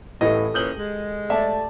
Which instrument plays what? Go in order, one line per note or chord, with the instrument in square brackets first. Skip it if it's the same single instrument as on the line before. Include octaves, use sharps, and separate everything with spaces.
[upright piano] A1 A2 E3 [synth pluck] G4 A4 [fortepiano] D#5
[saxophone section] A#2 E3 C#4 [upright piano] D#6 G6 F#7
[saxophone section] G#3
[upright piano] A3 [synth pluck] D5 A5 [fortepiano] E5